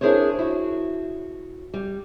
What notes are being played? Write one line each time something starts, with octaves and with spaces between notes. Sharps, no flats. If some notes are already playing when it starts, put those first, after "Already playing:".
D4 E4 G#4 A#4 C5 C#5
E4 F#4
G3